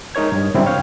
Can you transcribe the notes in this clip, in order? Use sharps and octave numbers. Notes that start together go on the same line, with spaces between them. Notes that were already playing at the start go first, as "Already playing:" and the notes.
G#3 D#4 A#4 C#5 G#6
G2
G2 C#3 F#3 G3 C4 E4
C#5 F5 G5